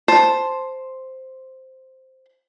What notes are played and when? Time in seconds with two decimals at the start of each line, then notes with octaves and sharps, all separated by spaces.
0.08 C5 A5